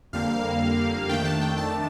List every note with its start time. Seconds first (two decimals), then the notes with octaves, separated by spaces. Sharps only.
0.13 F2 D3 G3 A#3 F5
1.09 F2 D#3 A3 D4 G5
1.25 A5
1.41 G5
1.58 A5